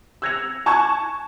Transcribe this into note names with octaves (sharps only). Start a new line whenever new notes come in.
E6 F#6 G#6 A#6 C#7 F7
G#5 A5 C#6 F#6 G#6 E7